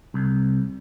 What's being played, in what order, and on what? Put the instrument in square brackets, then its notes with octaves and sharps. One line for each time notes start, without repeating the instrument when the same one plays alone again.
[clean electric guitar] C2